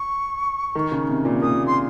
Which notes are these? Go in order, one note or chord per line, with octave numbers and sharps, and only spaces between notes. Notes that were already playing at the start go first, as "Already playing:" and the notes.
Already playing: C#6
D#3
C#3
C3
A#2
A#2 D#6
C6